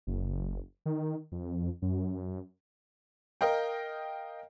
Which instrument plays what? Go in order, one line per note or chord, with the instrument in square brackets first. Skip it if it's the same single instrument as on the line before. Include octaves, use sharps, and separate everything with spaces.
[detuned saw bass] F#1
D#3
F2
F#2
[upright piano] A#4 D#5 F5 G5